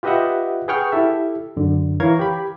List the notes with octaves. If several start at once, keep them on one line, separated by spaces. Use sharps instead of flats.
F4 G4 B4 D#5 E5 F#5
G#4 B4 F#5 G5 C#6 F6
E4 G4 A4 E5
F#2 D3
E3 A#4 C#5 F5 G#6
G4 B5